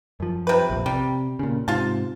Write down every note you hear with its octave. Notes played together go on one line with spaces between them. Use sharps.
F#2 F3
C3 B4
A#1 F2
C3 G3
A#2 C#3
G#2 C3 F4 A5